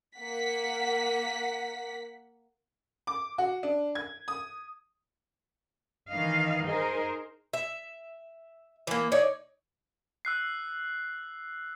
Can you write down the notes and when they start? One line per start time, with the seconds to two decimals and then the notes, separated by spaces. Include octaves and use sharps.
0.18 A#3 F#5 B6
3.07 D6
3.38 F#4
3.63 D4
3.95 G#6
4.28 D#6
6.11 D#3 E3 D#5 F5
6.65 D#4 G#4 A#4 C5
7.53 E5
8.87 E3 A#3
9.12 D#4 C#5 D5
10.25 E6 F#6 C7